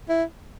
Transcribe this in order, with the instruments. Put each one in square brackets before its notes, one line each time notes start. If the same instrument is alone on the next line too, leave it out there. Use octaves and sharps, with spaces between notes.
[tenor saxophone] E4